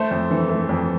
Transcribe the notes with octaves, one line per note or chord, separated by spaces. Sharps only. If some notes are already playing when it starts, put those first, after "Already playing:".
Already playing: A3 A4 C5
F2
E3
A3
F2